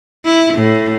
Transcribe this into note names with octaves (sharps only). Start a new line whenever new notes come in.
E4
A2